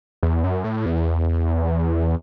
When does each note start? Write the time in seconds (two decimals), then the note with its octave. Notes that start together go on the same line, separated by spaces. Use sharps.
0.23 E2
0.44 F#2
0.64 A2
0.86 E2